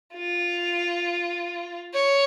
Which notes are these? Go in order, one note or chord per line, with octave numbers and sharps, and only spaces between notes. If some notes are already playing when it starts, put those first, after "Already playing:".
F4
C#5